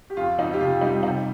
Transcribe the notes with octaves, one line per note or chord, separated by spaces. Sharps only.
G4
F2 F4
F2 D#4
G4
C3 F4
G3 D#4
C3 D#4